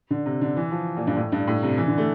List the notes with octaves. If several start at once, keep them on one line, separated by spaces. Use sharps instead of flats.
D3
C3
D3
E3
F3
A#2
G2
A2
G2
A2
C3
E3
D3
A3